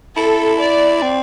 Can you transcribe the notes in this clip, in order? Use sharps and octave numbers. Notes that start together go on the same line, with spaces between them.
E4 A4
D5
C4